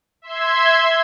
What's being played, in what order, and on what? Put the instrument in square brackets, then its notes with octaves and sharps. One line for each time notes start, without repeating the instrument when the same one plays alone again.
[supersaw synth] E5 C6 G#6